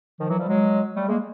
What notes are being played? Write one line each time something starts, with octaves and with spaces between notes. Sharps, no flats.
D#3 F3
E3 F#3
F3 G3
F#3 G#3
G3 A3
G#3 A#3